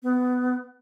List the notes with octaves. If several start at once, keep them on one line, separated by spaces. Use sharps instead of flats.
B3